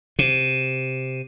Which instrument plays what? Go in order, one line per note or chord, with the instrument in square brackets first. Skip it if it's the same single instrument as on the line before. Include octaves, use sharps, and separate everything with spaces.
[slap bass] C3